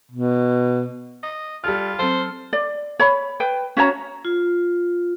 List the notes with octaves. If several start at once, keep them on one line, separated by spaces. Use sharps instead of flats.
B2
D#5
G3 F4 A4 F6
F#3 C4 A4 C5
D5
C#5 B5
B4 G5
C#4 F#4 C#5 A#5
F4